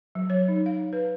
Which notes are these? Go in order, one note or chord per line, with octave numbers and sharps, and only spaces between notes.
F#3
C#5
D#4
F5
B4